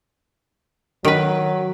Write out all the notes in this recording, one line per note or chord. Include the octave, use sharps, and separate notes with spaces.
D#3 F#3 B4